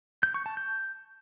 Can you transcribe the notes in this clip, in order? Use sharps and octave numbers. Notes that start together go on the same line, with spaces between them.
G6
C#6
A5
G6